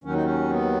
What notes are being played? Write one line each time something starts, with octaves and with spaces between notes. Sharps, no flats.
D#2 D#3 F#3 C#4
D#4
C#4
B3